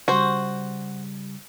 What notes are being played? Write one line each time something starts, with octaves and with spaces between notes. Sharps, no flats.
C#3 G3 F#4 C5